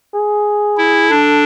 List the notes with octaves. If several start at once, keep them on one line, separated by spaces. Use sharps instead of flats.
G#4
E4
D4 A4